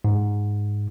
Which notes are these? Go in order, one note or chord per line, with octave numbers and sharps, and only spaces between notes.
G#2